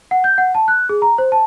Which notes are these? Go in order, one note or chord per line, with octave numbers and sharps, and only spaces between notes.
F#5
G6
F#5
A5
F#6
G#4
A#5
C5
A5